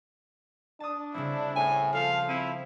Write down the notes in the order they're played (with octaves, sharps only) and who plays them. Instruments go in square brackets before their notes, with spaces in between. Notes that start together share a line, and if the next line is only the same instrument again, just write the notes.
[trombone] D4 [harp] A5 D#6
[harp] C#3 G3 C4 [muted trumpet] E4
[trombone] A2 [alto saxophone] G#5
[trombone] F3 [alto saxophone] A4 [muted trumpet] F5
[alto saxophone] C4 [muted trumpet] E4 [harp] D#7